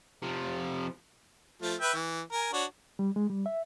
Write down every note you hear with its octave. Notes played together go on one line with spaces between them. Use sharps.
C3 F3
F3 A3
B4 E5 G5
E3
A#4 G#5
D4 F#4 C#5
G3
G#3
G3
E5